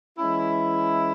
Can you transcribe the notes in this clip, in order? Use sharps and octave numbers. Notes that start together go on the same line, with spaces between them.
E3 G#3 C#4 E4